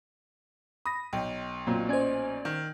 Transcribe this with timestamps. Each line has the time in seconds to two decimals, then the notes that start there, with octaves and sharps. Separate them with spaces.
0.86 B5 D#6 A#6
1.13 B1 G5
1.67 A#2 F#3 C4
1.89 C#4 C5 D5 G#5 G#6
2.45 D#3